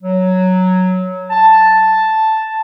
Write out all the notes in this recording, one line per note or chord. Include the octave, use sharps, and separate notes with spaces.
F#3
A5